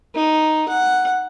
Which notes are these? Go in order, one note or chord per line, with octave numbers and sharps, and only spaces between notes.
D#4
F#5